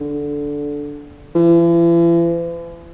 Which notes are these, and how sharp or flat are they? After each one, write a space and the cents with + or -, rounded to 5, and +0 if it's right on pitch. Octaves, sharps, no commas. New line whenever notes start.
D3 -10
E3 +45